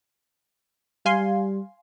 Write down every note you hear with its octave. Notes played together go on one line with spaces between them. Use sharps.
G3 F5 G#5 C6